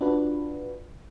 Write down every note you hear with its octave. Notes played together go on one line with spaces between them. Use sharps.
D4 F4 F#4 B4